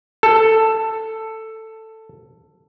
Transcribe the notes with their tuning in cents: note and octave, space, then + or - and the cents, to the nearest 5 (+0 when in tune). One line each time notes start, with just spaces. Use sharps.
A4 +10